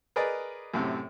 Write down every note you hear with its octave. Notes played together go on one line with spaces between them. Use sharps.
G#4 A#4 B4 D5 D#5
F#2 A2 C3